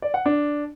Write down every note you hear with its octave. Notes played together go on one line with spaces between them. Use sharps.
D5
F#5
D4